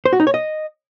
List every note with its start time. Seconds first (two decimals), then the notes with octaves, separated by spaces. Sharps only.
0.06 C5
0.13 F#4
0.20 D#4
0.27 C#5
0.34 D#5